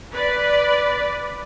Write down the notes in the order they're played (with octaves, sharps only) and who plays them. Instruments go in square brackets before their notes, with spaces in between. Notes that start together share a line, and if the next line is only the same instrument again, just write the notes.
[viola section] B4 D5